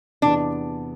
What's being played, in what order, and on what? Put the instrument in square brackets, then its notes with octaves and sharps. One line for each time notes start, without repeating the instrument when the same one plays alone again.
[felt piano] E2 C3 E3 B3 [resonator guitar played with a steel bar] D4